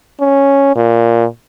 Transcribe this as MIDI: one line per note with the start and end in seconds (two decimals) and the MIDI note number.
0.20 0.73 61
0.76 1.24 46